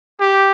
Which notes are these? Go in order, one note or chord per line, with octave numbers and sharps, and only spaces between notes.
G4